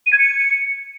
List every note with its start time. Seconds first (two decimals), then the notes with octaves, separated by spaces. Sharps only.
0.06 D#7
0.12 G#6
0.18 C#7